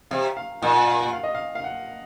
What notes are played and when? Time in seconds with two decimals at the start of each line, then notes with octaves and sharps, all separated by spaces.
0.11 C3 F5
0.37 F5
0.62 A#2 F#5
0.74 F#5
0.87 F5
1.00 F#5
1.13 F5
1.23 D#5
1.35 F5
1.55 F5
1.64 F#5